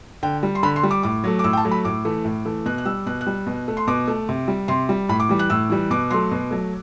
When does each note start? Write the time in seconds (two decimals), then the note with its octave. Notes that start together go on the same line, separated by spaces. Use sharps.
0.23 D3 G5
0.43 G3
0.55 C6
0.63 D3 B5
0.76 C6
0.83 G3
0.91 D6
1.03 A2 D6
1.24 F#3 A3
1.39 D6
1.44 A2 E6
1.53 G5
1.57 A5
1.65 F#3 A3
1.71 B5
1.85 A2 D6
2.05 E3 A3
2.25 A2
2.45 E3 A3
2.66 B2 F#6
2.78 F#6
2.85 G3 E6
3.06 B2 F#6
3.21 F#6
3.27 G3
3.47 B2
3.68 A3
3.77 C6
3.88 B2 D6
4.08 A3
4.29 C3
4.48 G3
4.68 C3 C6
4.89 G3
5.09 A2 B5
5.20 D6
5.29 E3 G3
5.39 F#6
5.50 A2 E6
5.70 E3 G3
5.90 B2 D6
6.11 F#3 A3 C6
6.31 B2
6.51 F#3 A3